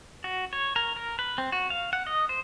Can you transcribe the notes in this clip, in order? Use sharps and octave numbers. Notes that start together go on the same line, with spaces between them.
F#4
C#5
A#4
A#4
B4
C4
F#4
F5
F#5
D#5
C5